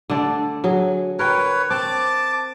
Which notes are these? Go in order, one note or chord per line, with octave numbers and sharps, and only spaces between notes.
D3 A3 D5
F#3 G#4
A#4 B4 C#5 G5
C4 A5 D6